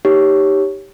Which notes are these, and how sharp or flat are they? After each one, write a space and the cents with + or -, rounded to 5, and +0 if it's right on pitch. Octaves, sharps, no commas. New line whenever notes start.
D#4 +0 G4 +0 C#5 +0